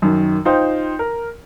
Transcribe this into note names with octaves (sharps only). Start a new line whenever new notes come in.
F#2 D#3
D#4 F4 C5 G5
A#4